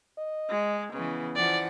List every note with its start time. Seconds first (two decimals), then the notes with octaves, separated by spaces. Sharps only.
0.18 D#5
0.49 G#3
0.94 C#3 E3 B3
1.36 E3 F3 D5 F#5